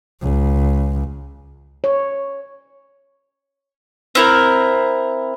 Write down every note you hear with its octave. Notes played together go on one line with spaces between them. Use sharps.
C#2
C#5
C4 E4 A#4